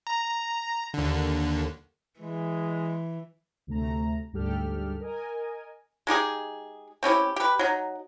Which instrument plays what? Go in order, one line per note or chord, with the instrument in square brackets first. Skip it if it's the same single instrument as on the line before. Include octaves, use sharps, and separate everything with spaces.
[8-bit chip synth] A#5
D#2 D3
[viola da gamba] E3 [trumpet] G#3
[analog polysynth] D2 C3 A3 A#5
D2 G#2 G3 G4 A4 F6
A#4 D#5 G#5
[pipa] G#3 D#4 G4 G#4
C4 C#4 E4 G4
G4 B4
F#3 D#4